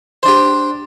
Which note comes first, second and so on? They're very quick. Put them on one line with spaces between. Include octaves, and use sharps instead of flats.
C5 D4 G4